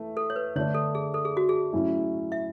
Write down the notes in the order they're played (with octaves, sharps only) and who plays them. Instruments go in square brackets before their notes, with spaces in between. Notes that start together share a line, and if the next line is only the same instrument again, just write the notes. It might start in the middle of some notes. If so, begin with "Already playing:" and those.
Already playing: [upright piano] E3 A3
[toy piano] A4
C#5
B4
[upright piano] D3 A3 D4 [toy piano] C#5
[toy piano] A4
G#4
A4
G#4
F#4
G#4
[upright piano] A2 F#3 C#4 E4
[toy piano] E5